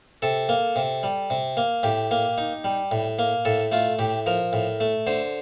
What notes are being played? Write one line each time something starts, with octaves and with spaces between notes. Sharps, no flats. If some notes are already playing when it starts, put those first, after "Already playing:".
C3 A4
A#3
C3
G3
C3
A#3
A2 G4
A#3
D#4
G3
A2
A#3
A2 A4
A3 F4
A2 G4
F3 A#4
A2
A3
D3 C5